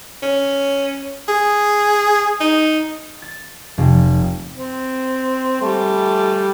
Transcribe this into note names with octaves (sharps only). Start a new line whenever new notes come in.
C#4
G#4
D#4
A6
F1
C4
G3 A3